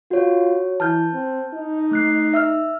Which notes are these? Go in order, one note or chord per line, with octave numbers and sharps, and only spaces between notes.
F4 F#4 C#5
E3 A5 F6 G6
C4
D#4
A3 F#6 C7
E5 E6 F6